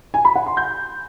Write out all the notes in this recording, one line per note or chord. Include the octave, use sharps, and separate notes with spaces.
G#5
B5
F#5
C6
G6